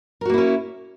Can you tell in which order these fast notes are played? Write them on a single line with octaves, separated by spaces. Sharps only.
A#4 F#4 A#3 E4 C#4